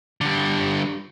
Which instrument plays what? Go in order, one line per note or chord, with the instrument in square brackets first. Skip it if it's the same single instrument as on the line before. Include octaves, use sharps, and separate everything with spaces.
[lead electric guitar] D3 G3